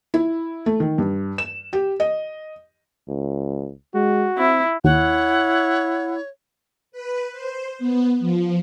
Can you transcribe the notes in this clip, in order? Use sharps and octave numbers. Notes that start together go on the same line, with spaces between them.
E4
A3
D#3
G2
E7
G4
D#5
C#2
G#3 F#4
C4 E4
D#2 E4 C#5 F#5
B4
C5
B3
F3